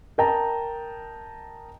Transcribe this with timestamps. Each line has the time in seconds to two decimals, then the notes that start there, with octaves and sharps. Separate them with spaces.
0.18 A#4 D#5 G5 A5 A#5